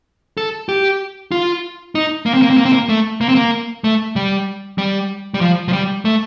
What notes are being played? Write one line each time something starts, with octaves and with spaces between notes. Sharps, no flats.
A4
G4
F4
D#4
A#3
C4
A#3
C4
A#3
C4
A#3
A3
A#3
C4
A#3
A3
G3
G3
G3
F3
F3
G3
A3